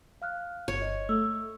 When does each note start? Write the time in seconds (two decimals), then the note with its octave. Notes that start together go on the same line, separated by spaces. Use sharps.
0.22 F5 F6 F#6
0.68 G1 C#5
0.82 D#5
1.09 A3 E6